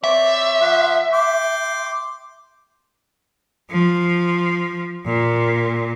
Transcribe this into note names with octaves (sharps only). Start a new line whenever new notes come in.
C4 C#5 D5 E5
F3 F#5 C6
G5 C6 D6
F3
A#2